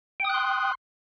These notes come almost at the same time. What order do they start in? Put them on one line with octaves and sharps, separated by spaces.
G5 D#6 F#6 C6